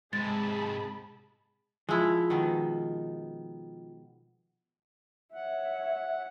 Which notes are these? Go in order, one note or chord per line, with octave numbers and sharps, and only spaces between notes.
G#2 C3 G#3 G#4 A5 B5 A6
F3 G#3 E4
B2 D#3
C#5 E5 F#5